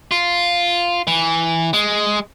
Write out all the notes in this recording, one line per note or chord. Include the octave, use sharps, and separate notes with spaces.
F4
E3
G#3